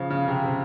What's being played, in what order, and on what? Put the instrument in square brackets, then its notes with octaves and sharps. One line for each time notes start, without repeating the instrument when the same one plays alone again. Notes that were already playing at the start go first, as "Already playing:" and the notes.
Already playing: [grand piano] C#3 F3
C#3
C3
C3